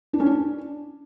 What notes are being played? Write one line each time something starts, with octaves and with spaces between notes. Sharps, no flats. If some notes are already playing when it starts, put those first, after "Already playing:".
D4
C#4
D4